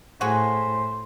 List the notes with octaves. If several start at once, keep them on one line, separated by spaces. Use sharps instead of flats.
A2 F#4 G#4 C5